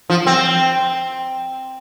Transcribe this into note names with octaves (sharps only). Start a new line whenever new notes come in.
F3
C4